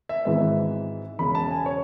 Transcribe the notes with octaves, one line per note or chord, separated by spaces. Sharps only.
E5
G#1 G#2 E3 G#3 B3 E5
E1 E2 C#3 B5
A5
G#5
C#5